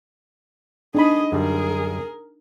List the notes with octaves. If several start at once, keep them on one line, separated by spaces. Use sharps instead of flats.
D4 D#4 G#4 D#5 B5
F#2 D3 G3 G#4 A#4